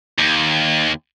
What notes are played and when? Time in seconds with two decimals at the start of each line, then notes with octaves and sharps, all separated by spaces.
0.18 D#2